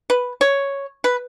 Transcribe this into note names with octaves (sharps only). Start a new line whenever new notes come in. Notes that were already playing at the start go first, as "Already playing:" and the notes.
B4
C#5
B4